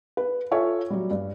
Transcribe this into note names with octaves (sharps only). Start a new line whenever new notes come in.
B4
F4 A4 C#5 E5 G#5
F#3 G3
G2